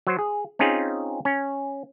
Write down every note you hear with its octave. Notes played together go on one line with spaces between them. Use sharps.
F#3 C5
G#4
C4 C#4 D#4 F4 G#4
C#4